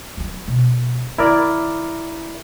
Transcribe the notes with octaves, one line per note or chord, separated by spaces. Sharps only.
F#3 C#4
B2
D#3 E4 A#4 D5